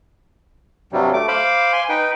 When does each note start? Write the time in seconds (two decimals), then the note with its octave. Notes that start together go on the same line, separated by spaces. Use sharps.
0.92 G2 C3 F#3 G3
1.13 A3 D6
1.28 C5 F5 B5 D6
1.73 G#5 C6
1.89 D#4 B4 G5